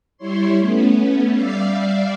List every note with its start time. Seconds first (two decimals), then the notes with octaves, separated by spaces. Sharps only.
0.17 G3 E4 C#5 C6
0.58 A3 B3 C#4
1.33 G3 D5 E5 F5 C7